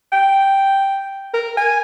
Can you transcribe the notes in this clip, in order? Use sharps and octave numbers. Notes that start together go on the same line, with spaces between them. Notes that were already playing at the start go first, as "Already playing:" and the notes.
G5
A#4
G#5